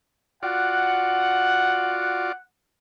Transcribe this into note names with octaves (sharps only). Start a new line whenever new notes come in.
F4 F#4 D5 F#5